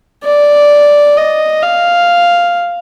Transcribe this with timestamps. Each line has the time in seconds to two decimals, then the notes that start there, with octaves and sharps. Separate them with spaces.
0.25 D5
1.17 D#5
1.63 F5